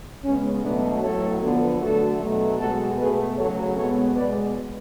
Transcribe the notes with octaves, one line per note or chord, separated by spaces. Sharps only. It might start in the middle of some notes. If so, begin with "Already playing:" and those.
C#3 G#3 B3 C#4
B2 F#3 A3 B3 D4
A2 F#3 A3 A4 C#5
D3 F3 B3
D3 F#3 A3 F#4 A4
B2 F#3 A3
B2 G#3 B3 F#4 A4
B2 A3 G#4 B4
C#3 F#3 A3 A4 C#5
B2 G#3 B3 A4 C#5
B2 G#3 B3 B4 D5